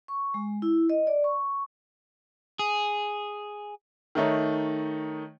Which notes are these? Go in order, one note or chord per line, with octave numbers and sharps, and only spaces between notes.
C#6
G#3
E4
D#5
D5
C#6
G#4
D#3 A3 D#4 C#5